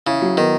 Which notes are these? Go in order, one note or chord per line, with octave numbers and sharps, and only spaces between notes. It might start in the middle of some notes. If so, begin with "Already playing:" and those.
C#3 E4
F#3
D#3 B3